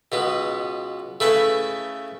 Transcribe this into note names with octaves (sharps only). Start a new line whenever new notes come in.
C#2 B2 B3
C#3 A3 E4 B4 E5